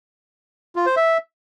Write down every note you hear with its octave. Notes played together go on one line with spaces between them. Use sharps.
F4
C5
E5